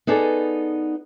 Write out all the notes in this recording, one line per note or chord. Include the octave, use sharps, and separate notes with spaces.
B3 D#4 G#4 A4 D5